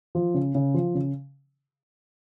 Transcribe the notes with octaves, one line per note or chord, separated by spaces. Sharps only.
F3
C#3
C#3
F3
C#3